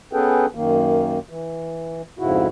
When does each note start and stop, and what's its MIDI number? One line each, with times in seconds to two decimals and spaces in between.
0.13 0.46 59
0.13 0.46 61
0.13 0.46 68
0.13 0.46 69
0.13 0.46 71
0.13 0.46 79
0.55 1.19 42
0.55 1.19 51
0.55 1.19 58
1.29 2.02 52
2.19 2.47 41
2.19 2.47 44
2.19 2.47 49
2.19 2.47 64
2.19 2.47 66